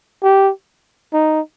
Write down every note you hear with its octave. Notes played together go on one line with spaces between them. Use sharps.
G4
D#4